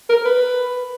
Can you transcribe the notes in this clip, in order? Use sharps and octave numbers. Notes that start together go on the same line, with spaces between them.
A#4
B4